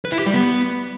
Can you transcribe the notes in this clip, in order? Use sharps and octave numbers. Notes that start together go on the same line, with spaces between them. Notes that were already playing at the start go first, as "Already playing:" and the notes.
B4
E4
G4
G3
B3